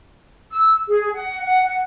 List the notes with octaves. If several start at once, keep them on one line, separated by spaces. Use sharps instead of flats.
E6
G#4
F#5
F#5
F#5